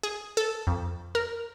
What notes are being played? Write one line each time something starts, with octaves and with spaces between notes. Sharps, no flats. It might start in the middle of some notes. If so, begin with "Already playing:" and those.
G#4
A4
F2
A#4